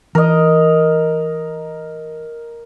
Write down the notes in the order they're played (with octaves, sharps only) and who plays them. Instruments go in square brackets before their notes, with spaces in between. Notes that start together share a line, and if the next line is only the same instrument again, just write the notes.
[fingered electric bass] E3 [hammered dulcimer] A#4 D#5